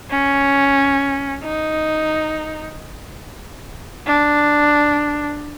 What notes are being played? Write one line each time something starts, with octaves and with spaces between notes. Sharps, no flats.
C#4
D#4
D4